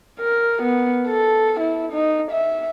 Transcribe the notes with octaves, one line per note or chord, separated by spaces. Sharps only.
A#4
B3
A4
E4
D#4
E5